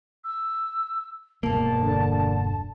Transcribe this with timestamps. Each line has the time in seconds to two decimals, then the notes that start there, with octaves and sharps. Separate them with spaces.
0.24 E6
1.43 E1 G2 A#3 A5
1.81 D3